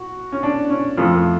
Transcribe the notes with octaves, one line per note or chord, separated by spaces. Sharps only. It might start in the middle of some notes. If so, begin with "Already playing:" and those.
Already playing: F#4
C#4
D4
C#4
F2 F3 A3
A3